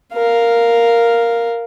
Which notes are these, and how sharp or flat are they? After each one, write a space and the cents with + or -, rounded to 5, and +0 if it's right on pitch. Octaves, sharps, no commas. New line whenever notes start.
A#4 +0 F5 +0